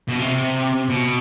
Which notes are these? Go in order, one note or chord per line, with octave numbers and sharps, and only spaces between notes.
B2
C3
B2